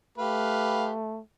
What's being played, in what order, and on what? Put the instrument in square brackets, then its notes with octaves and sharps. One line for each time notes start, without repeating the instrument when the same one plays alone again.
[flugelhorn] A3 [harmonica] G4 B4 F5